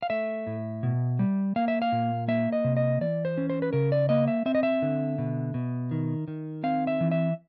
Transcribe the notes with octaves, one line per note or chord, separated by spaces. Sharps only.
F5
A3 E5
A2
B2
G3
A#3 F5
E5
F5
A#2
A#3 E5
D#5
C3
D#5
E3 D5
C5
C#4
C5
B4
C#3 A#4
D5
A#3 D#5
E5
C4 E5
D#5
E5
D3
B2
B2
D#3
D#3
C4 F5
E5
E3
E5